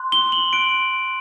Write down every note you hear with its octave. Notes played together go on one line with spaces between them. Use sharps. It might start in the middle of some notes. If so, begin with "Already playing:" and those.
Already playing: C6 F#6
G7
F#7
C6 F#6 D7